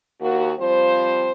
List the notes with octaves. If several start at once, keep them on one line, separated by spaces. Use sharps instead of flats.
D#2 A#3 F#4
F3 G3 C4 F4 C5